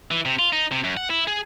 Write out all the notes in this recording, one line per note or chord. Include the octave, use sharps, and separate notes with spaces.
E3
C3
F4
D#4
C3
F#2
F#5
E4
G#4